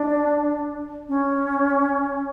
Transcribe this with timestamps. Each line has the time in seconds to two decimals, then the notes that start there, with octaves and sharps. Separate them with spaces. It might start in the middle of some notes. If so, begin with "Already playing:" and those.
Already playing: D4
1.09 C#4